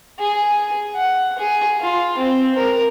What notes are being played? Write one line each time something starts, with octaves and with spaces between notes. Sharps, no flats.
G#4
F#5
G#4
F4
C4
A#4